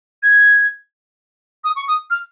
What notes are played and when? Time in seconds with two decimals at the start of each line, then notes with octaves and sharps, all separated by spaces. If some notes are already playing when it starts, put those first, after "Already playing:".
0.23 G#6
1.64 D#6
1.76 C#6
1.88 D#6
2.10 F6